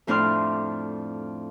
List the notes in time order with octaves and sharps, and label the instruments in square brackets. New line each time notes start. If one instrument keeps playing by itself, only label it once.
[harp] F2 A2 D4 D5 C6 F6